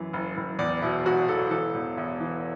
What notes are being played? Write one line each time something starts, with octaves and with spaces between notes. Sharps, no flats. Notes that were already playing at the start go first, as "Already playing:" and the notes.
Already playing: F#2 E3
F#1
F#1
E2 D5
B2 E4
E1 F#4
E1 A4
E3 A4
E2
E2 E4
E3